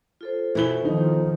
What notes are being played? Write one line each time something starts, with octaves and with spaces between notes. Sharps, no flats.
F4 A4 C5
B2 E3 E4 G7
D#3 F3 D#4